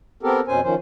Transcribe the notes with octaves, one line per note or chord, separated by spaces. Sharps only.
B3 C4 G4 A4 A#4
F2 B2 C#4 C5 G#5
D#3 F3 C#4 C5